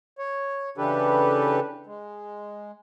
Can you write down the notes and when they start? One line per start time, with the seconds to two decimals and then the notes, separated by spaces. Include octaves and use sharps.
0.18 C#5
0.78 C#3 E3 D4 G4 A4 B4
1.87 G#3